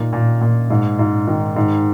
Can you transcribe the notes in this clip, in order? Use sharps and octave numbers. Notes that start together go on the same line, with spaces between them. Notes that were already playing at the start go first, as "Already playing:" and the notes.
Already playing: A#2 D#4
A#2
A#2
G#2
G#2
D#3
G#2